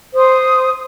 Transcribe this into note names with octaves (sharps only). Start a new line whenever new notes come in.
C5 D#6